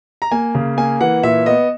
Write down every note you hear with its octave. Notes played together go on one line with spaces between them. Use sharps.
A#5
A#3 G#5
C#3
A#3 G#5
E3 F#5
A#2 E5
B3 D#5